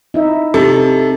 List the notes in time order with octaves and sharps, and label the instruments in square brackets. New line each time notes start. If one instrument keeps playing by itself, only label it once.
[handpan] D#4 E4 E5
[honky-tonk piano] C3 [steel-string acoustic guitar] A4